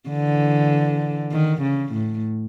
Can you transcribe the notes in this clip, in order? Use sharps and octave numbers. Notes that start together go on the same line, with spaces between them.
D3 E3
D#3
C#3
A2